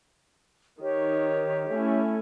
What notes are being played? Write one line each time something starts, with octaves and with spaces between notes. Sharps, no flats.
D#3 G4 C#5
A3 C#4 E4